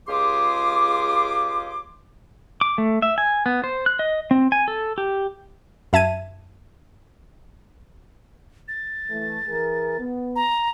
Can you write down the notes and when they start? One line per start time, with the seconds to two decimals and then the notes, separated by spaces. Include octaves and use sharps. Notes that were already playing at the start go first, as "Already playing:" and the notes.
0.08 C#2 F4 G4 G#4 C6 D6
2.61 D6
2.78 A3
3.02 E5
3.18 G#5
3.46 B3
3.64 C5
3.86 F#6
3.99 D#5
4.31 C4
4.52 G#5
4.68 A4
4.98 G4
5.93 F#2 E5 A5 G#6 D#7
8.68 A6
9.09 E3 A3
9.48 E3 G#4 A#4
9.99 B3
10.36 A#5